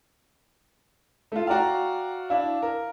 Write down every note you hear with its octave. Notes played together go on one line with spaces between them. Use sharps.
A3 F4
F#4 D5 F5 G5 A#5
D4 E4 F5
A#4